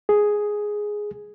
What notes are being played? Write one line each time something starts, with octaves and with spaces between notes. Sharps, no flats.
G#4